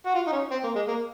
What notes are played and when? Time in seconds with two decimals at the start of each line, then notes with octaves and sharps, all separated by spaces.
0.06 F#4
0.14 F4
0.27 D#4
0.32 C#4
0.51 C4
0.64 A#3
0.76 G#3
0.88 A#3